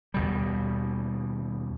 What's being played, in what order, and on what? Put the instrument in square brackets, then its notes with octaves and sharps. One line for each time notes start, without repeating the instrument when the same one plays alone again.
[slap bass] D#2 B2 G3